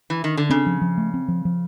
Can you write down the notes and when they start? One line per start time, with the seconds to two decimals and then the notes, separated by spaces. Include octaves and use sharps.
0.10 E3
0.24 D#3
0.37 D3
0.50 C#3 C4
0.66 F3
0.82 F3
0.98 A3
1.14 C4
1.28 F3
1.45 F3